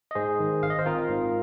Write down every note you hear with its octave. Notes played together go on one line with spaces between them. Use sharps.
D#5
G#2 G#4 C5
D#3
G#1 F5
D#5
C5
C4 F4 A#4
G#2